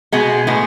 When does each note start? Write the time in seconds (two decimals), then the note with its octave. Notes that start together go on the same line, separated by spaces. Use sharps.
0.12 B2 G#3 B3
0.47 A2 G#3 B3